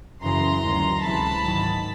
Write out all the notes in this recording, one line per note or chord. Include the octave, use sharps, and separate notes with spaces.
F#2 C#3 E3 A#5 C6
D2 C3 D#3 F#3
C#2 C3 E3 A5 B5
G#2 D#3 F#3